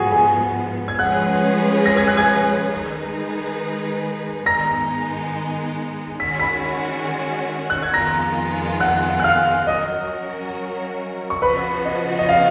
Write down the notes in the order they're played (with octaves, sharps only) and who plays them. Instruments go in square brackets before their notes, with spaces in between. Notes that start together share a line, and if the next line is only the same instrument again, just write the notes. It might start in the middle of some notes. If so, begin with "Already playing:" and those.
Already playing: [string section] G#2 F3 B3 [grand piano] F#4 G#4 F#5 G#5
[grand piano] G#4 G#5
G#6
[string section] F3 G#3 C#4 G#4 B4 [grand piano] F#5 F#6
[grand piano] A#6
G#6
F#6
G#5 G#6
[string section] D#3 G#3 D#4 G#4 B4
[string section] G#2 D#3 G#3 B3 D#4 [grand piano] A#5 A#6
[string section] D#3 G#3 C#4 F#4 [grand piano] B6
[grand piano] B5 B6
F#6
G#6
[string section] F2 D#3 G#3 B3 F4 [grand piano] A#5 A#6
[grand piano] F#5 F#6
F#6
F5 F6
[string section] F#3 C#4 F#4 A#4 [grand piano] D#5 D#6
[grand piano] C#6
[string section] C#3 F3 B3 F#4 [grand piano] B4 B5
[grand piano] D#5
D#5
F5